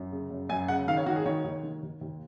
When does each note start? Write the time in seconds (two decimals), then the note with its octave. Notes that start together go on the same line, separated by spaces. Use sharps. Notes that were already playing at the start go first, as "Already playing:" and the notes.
Already playing: F#2
0.12 C#3
0.31 F#2
0.49 F#2 G#5
0.68 C#3 F#5
0.87 D#3 F5
0.97 C#5
1.06 D#3 F#4
1.16 G#4
1.25 D#3 C#5
1.44 D#2
1.63 D#3
1.83 D#2
2.01 D#2